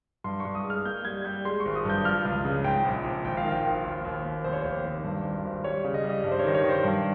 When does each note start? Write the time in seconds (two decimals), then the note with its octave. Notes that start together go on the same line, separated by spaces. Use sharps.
0.24 G2 C6
0.40 G2 C#6
0.55 D#6
0.64 G#3
0.70 F6
0.85 A#3 G6
1.05 G3 G#6
1.25 G3 G6
1.45 G#3 C6
1.60 C#6
1.65 G#1
1.75 D#6
1.85 G2 G6
2.04 F3 F6
2.25 C#2
2.45 C#3
2.64 G#2 G5
2.85 A#1
3.04 A#1
3.24 G#1 G5
3.37 F5
3.44 D#3
3.49 G5
3.65 G#1
3.85 D#2
4.05 D#2
4.25 D#2
4.44 F1 C5
4.53 C#5
4.62 D#2 C5
4.84 D#3
5.04 G2
5.24 G#1
5.45 G#1
5.64 G3 C#5
5.84 C#3
5.94 D#5
6.04 G3
6.09 D#5
6.24 G2
6.31 C5
6.39 D#3 C#5
6.55 C#5
6.64 D#3
6.69 C5
6.84 G2